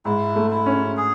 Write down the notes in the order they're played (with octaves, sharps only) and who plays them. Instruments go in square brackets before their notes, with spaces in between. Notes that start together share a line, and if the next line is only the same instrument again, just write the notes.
[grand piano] G#2 [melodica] E4
[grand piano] A3
[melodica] E4
[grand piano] C#4
[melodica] G#4